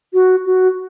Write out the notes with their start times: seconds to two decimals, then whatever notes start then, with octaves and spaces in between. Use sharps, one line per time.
0.13 F#4
0.46 F#4